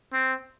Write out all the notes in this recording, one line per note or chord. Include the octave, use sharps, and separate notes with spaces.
C4